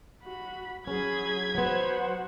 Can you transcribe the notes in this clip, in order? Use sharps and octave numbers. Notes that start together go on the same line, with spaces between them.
F#4 B5
F#3 C#4 G#4 B5 G#6 B6
F#3 B3 F#4 C5 F#5